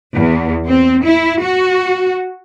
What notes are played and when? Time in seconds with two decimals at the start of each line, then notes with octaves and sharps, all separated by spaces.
0.16 E2
0.67 C4
1.05 E4
1.42 F#4